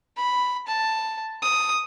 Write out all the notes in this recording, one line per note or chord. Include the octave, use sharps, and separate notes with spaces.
B5
A5
D#6